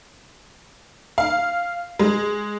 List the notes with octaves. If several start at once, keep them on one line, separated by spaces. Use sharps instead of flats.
F5
G#3